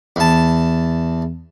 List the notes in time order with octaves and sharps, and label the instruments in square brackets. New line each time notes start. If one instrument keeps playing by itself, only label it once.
[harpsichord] E2 A5